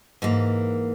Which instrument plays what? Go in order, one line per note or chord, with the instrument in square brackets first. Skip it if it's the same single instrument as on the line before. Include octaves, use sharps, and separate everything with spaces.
[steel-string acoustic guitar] G#2 E3 A#3